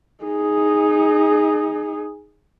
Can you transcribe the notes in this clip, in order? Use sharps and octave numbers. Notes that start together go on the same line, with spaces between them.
D#4 G#4